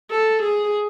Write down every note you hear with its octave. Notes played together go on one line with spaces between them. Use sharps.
A4
G#4